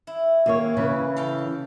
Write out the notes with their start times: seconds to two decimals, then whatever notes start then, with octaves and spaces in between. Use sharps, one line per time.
0.07 E4
0.46 D#2 A#3 C#5
0.77 C#3 E3 B4
1.16 A4 F5 G5